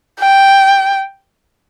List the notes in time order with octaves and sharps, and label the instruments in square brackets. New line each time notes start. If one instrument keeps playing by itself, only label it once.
[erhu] G5